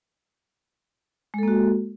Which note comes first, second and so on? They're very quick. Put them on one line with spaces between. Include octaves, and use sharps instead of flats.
G#3 A4 A#3 F#4